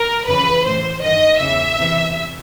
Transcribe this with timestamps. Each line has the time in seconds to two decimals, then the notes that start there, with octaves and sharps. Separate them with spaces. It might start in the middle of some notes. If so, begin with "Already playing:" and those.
Already playing: A#4
0.27 F2 C#3 E3 B4
0.65 A2 E3 C5
1.02 G2 D#3 D#5
1.40 E2 C#3 E3 E5
1.78 E2 C3 E3